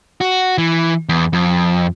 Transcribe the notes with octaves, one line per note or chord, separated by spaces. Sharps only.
F#4
E3
E2
F2